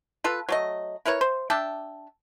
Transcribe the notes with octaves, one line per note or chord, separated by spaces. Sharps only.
F4 A4 B4
F#3 A3 D#5
E4 A#4 B4 C#5
C5
D4 E5 G5 A5